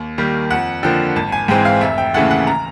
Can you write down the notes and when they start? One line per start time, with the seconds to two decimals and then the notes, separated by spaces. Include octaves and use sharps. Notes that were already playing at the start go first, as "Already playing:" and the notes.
Already playing: D#2
0.18 D#3 G3 A#3
0.50 F2 F#5
0.83 D3 F3 A#3 G5
1.16 G#1 A5
1.32 G#5
1.48 G#2 E3 G#3 C4 G5
1.65 F5
1.81 F1 E5
1.98 G5
2.14 D#2 C#3 E3 A3 F#5
2.31 F#5
2.47 A#5